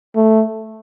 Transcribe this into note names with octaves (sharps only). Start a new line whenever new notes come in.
A3